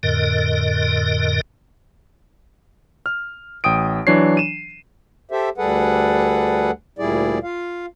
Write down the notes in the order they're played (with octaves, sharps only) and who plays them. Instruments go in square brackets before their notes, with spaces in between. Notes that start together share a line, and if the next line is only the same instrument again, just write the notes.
[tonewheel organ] F2 A2 D3 A#4 D#5
[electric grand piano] F6
A1 G5 D#6 D7
E3 F#3 D4 C#5 C7
D#7 E7
[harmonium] G4 A4 C5 E5
D2 G3 G#4 A4 B4 F#5
D2 A#2 G3 E4 G#4 D5
F4 F5